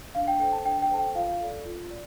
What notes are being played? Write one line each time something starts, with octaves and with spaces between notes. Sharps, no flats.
D4 F5
G5
A4 C5 G5
A5
D4 G5
G5
A4 C5 A5
G5
F4 F5
A4 D5
F4
D5